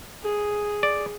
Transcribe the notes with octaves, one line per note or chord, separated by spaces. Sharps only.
G#4
D5